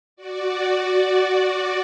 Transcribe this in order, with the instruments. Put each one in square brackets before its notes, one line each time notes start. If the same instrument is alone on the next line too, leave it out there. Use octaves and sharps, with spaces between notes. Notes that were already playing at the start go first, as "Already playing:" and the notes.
[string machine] F#4 D5